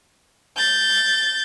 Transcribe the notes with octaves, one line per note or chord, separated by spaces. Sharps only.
G6 A6